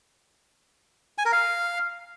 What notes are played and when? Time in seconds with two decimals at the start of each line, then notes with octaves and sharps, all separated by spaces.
1.18 G#5
1.25 A#4
1.32 F5